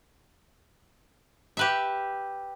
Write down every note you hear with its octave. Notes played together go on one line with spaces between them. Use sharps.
G4 B4 E5